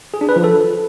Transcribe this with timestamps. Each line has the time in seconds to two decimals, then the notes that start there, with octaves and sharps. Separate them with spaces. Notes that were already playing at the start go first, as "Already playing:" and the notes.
0.14 G#4
0.21 D4
0.29 B4
0.36 F3
0.44 A4